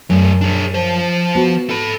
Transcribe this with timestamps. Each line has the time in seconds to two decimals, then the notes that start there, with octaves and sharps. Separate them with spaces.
0.10 F#2 F#3 A3
0.41 D4 G#4
0.74 F3 C5
1.35 B3 F#4
1.70 A4 B5